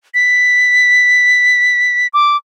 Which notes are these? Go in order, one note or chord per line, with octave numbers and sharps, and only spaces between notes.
B6
D6